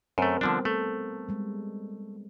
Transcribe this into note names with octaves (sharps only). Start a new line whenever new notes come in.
F#2 A3 C4 A#4 C5
D3 F3 G3 B3 D4
A3 A4
G3 G#3